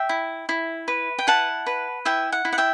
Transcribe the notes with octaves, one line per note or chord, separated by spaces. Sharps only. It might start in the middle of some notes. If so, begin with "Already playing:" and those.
Already playing: E5 G5
E4
E4
B4
G5
E4 F#5 A5
B4
E4 E5 G5
F#5
E4
F#5
E5 G5